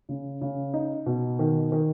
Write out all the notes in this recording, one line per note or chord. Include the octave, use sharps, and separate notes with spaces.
C#3
C#3
D#4
B2
D#3
D#3